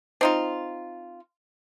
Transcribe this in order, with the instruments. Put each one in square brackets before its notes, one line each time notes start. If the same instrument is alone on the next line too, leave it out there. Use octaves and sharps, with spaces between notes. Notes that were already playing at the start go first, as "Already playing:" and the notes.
[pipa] C4 D#4 F4